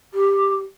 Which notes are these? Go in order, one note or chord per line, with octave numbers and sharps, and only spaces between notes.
G4